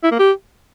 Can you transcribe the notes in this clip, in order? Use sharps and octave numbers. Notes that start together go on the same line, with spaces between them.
E4
A#3
G4